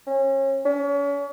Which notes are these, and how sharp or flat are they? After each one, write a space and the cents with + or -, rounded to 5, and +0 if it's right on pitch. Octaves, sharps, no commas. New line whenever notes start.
C#4 -35
C#4 +35